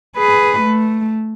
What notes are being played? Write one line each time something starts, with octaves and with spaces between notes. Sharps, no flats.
G#4 B4
A3